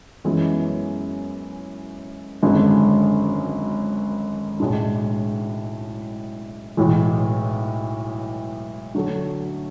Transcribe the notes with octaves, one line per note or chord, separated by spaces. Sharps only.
F#2 E3 G#3 B3 E4
G#1 F#2 D3 G#3
B1 A2 G#3 D4
B1 A2 E3 G#3
D3 F#3 A3